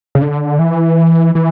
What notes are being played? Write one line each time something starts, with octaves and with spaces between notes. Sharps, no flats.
C#3
D3
E3
E3